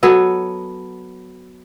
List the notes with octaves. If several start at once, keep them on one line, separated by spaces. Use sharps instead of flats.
F#3 B3 A4